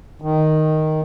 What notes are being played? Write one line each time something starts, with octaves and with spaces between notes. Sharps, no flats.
D#3